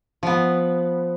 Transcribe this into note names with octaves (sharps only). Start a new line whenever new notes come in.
F3 B3